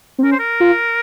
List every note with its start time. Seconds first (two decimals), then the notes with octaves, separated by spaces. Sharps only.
0.18 C4
0.23 C#4 A#4
0.32 C5
0.39 A#4
0.60 F4